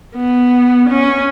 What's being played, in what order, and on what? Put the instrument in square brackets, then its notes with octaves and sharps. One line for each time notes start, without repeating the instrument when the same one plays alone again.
[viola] B3
C#4